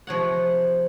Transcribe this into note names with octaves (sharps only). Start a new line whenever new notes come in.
C3 F3 C#5 F#5